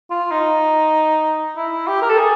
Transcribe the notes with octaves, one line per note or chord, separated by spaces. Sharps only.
F4
D#4
E4
G4
A#4
A4
G#4